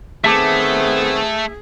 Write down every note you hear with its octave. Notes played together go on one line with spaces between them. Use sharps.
D#3 A3 B3 C4 G#4 E5 A5 D6